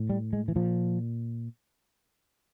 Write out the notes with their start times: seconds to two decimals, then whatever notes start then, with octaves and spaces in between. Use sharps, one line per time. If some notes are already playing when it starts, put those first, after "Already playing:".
Already playing: A2
0.10 G3
0.33 G#3
0.48 E3
0.56 A#2 F3